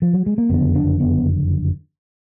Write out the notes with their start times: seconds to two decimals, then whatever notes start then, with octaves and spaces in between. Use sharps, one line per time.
0.02 F3
0.13 F#3
0.26 G#3
0.38 A#3
0.49 F#1 F2 D3 B3
0.75 D4
1.00 B3